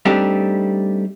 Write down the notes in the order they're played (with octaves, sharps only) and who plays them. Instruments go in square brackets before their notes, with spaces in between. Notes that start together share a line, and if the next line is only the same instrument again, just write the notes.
[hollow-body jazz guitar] G3 A3 C4 D4 D#4 G4